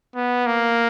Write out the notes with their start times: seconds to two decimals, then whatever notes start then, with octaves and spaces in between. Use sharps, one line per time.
0.15 B3
0.46 A#3